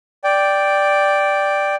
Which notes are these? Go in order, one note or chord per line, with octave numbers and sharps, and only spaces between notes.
D5 G5